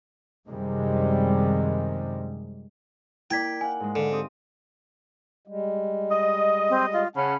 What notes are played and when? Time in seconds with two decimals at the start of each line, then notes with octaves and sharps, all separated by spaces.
0.49 F#2 C3 D#3 G3 G#3
3.31 A#3 E4 D5 G5 G#6 B6
3.61 E4 F5 F#5 G#5
3.80 G#2 G#3
3.96 D3 E5 F5 B5
4.11 C4 G4 D#6
5.47 G3 G#3
6.12 D#5
6.70 C4
6.93 F4
7.16 C#3 C#4 F#5 A5 B5